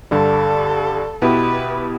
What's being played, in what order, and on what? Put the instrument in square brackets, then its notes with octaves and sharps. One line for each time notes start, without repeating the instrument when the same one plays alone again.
[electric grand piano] G2 D3 G3 [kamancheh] A4
[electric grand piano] B2 B3 E4 G4 [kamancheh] B4